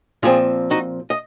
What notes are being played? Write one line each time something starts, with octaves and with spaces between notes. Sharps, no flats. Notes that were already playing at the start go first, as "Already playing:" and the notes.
A#2 F3 C4 F4 G#4
D#4 F#4
D#5